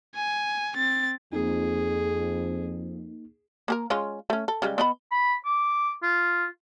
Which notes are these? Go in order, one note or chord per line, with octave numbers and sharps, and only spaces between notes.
G#5
C4 A6
F2 A#3 D#4 G#4
A#3 G#4 A#4
G#3 C#4 F4
A3 C#4
A4
C#3 G3 G#3
B3 D#5 B5
B5
D6
F4